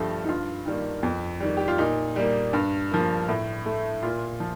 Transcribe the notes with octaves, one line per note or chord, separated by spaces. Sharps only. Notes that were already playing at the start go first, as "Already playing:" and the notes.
Already playing: G2 F3 A3 G4 A4
D#4
G2 F4
D#3 G3 A#3
F2
D#3 G3
G4
F4
A#2 D#4
G3 A#3
G2
F3 A#3
A2
A3
A#2 F4
F3